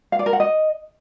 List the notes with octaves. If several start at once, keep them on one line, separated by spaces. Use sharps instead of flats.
F5
D5
A#4
F#5
D#5